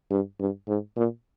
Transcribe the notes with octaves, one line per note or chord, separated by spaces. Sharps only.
G2
G2
G#2
A#2